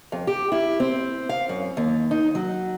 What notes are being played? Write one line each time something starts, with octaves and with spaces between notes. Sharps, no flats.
F2
G4
E4
C4
F5
F#2
D#2
D#4
F#3